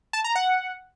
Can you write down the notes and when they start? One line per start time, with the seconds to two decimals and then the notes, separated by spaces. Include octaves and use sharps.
0.13 A5
0.24 A#5
0.35 F#5